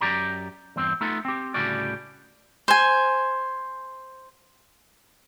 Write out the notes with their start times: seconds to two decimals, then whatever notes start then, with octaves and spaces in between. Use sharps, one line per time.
0.01 F#2 B2 G4 D5 A#5
0.76 E2 G2 C4
1.01 A3 B3 D#4 F4 A4
1.25 C4 G4
1.54 D2 A2 C#3 G3 F#4 D5
2.68 C5 G#5